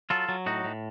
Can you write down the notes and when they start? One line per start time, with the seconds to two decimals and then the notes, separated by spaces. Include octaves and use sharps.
0.10 F#3 F4 A4
0.29 F#3
0.46 A2 D#4 F#4
0.65 A2